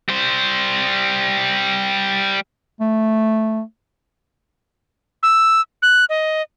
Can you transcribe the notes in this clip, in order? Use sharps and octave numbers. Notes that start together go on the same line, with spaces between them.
G3 C5
A3
E6
F#6
D#5